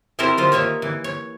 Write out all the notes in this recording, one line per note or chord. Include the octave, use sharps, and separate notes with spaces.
C4 E4 G4 A4 A#4 C5
D#3 F4 C5
A#3 D#4 C#5 E5
E3
C#5